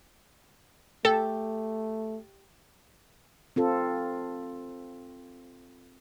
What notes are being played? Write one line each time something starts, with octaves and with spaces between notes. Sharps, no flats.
A3 G4 A4
C4 F4 A4